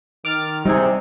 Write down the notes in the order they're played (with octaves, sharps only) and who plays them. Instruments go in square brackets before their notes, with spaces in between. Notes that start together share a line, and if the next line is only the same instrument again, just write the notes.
[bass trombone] D#3 [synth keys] D6 F6 A6
[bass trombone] C3 [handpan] G3 [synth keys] D#4 G#4